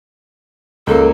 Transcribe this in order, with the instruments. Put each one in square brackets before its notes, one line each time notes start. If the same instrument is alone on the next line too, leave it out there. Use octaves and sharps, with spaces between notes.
[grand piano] C#2 A#3 [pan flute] A4